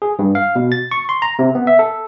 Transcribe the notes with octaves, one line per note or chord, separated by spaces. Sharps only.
G#4
G2
F5
B2
A6
C#6
C6
A#5
C3
B3
E5
A4